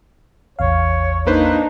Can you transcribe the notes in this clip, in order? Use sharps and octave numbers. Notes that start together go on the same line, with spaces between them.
A1 E2 C#5 F5
A#3 D4 D#4 B4 C5